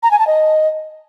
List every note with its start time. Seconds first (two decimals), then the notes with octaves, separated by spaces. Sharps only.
0.03 A#5
0.11 G#5
0.19 A5
0.27 D#5